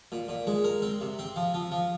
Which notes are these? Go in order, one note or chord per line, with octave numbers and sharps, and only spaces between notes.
A#2
A#2
G#3
A#4
C4
C3
C4
F3
F3
F3